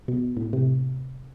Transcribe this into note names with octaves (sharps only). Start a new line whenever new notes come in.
B2
A2
C3